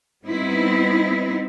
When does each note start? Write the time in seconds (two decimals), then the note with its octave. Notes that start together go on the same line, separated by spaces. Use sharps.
0.25 G3 B3 C4 D#4 E4